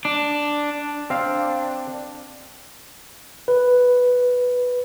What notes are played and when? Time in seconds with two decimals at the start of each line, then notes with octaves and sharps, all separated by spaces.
0.05 D4
1.10 C4 D4 F5
3.48 B4